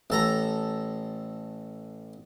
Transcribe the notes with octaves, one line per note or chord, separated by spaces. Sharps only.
A1 A4 A#5